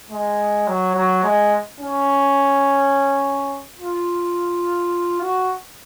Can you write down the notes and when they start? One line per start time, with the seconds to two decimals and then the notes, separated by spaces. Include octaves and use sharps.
0.10 G#3
0.68 F#3
0.95 F#3
1.24 G#3
1.81 C#4
3.79 F4
5.21 F#4